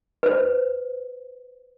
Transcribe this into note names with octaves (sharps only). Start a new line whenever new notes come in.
B4 C5